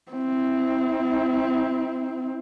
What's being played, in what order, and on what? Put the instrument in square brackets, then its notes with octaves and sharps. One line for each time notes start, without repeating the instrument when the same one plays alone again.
[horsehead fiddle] C4 E4